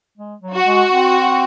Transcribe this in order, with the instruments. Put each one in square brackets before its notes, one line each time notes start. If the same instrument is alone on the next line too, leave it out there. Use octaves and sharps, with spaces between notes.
[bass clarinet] G#3
F#3
[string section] F#4
[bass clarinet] G#3
C4